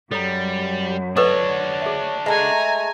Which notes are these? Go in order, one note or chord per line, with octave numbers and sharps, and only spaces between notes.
F#2 G3 A4 C#5 A#5
D4 F#4 A4 B4 C#5 D#5
G#4 E5
G#3 A3 G#5 A#5